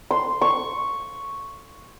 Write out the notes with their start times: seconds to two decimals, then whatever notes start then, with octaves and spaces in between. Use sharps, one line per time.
0.11 C6
0.41 C#6